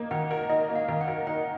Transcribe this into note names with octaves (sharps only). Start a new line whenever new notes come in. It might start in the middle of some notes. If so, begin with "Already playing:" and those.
Already playing: A#3 D#4
D#3 F#5
A#4
D#4 D#5
A#3
F5
D#3
F#5
A#4
D#4 F#5